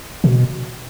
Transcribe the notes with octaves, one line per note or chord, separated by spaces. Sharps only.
B2